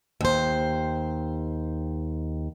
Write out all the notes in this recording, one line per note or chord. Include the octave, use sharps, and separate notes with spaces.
D#2 C5